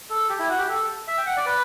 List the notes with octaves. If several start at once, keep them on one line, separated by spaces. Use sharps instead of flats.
A4
G4
E4
F#4
G4
A4
E5
G5
F#5
D5
B4